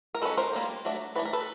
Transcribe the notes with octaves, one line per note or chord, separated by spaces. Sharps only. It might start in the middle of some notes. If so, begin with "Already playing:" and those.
A#4
G#3 C#4 A4 B4
A#4 C5
G3 A#3 D4
F#3 A3 D4
E3 A3 D4 B4
A#4
A4 B4